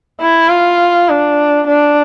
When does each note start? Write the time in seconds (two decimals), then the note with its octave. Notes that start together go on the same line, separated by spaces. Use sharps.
0.21 E4
0.50 F4
1.09 D4
1.68 D4